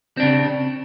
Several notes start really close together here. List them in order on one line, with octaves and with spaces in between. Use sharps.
C4 D4 C#3